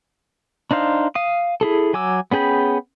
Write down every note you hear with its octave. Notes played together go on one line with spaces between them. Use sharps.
D4 D#4 C5 F5
F5 D#6
E4 G#4 A4
F#3 G#5 D6 E6
B3 C#4 G#4 G5 B5